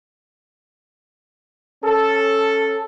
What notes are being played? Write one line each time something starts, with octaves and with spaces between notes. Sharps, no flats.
C#4 A4